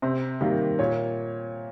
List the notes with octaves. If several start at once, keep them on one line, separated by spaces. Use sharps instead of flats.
C3 C5
D#3 G3 A#3
A#2 C#5